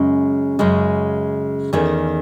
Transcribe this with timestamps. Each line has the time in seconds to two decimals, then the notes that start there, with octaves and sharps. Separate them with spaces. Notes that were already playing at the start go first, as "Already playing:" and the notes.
Already playing: F#2 C#3 G#3 C#4
0.59 F#2 C#3 G#3
1.73 E2 D#3 A3 C#4 G#4